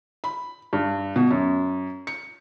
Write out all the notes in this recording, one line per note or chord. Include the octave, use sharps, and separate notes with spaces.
B5
G2
B2
F#2
C#7